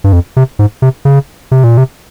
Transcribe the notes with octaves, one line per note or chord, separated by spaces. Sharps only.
G2
F2
C3
G#2
C3
C#3
C3
A#2
C3